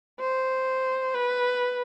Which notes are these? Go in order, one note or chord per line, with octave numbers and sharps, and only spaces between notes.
C5
B4